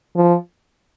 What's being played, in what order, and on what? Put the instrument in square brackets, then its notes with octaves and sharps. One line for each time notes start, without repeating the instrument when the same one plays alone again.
[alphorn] F3